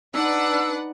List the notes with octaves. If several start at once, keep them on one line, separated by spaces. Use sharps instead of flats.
D4 D#4 B4 D5 F#5 E6